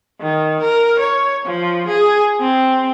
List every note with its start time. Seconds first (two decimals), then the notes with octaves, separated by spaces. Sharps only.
0.20 D#3
0.61 A#4
0.99 C#5
1.45 F3
1.88 G#4
2.40 C4